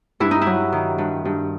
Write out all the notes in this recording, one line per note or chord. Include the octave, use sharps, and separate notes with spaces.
G2 E4
D#4
F#3 E4
D#3
G2
G2